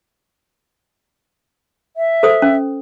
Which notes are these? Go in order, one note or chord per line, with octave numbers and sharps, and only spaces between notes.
E5
A4 C5 D#6
C#4